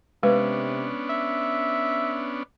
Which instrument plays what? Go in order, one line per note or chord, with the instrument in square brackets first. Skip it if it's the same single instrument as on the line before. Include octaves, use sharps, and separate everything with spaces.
[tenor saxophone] C3 [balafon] G#3 B4 [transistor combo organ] B3 C#4 D4
[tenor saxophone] E5